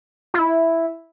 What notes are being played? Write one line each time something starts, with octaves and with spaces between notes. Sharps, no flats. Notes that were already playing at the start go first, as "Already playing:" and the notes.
F4
E4